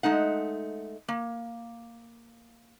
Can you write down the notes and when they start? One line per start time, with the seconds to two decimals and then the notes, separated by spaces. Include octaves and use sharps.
0.03 G#3 A3 D#4 F#5
1.08 A#3